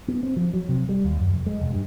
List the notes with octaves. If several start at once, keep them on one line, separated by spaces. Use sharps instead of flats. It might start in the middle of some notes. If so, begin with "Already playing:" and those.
B3
C4
F3
F#3
C3
G3
D#2
F#2
F1
G#3
E1
G2